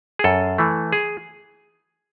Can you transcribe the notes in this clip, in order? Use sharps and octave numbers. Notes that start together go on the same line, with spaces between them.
G#4
F#2 A4
E3 A3
G#4